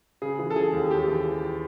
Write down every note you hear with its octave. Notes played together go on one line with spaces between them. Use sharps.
C#3 G#4
E3
A4
E3 G#4
D#2
D#2 G4
E3